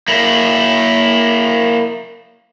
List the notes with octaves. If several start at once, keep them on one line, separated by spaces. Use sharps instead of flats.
A#3 E4